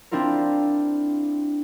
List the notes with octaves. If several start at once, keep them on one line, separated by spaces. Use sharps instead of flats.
C4 D4 E4 F4 A#4